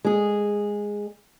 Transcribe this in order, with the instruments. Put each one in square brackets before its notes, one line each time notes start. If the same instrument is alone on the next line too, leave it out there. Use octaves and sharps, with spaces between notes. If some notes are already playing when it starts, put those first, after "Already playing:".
[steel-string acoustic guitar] G#3 G#4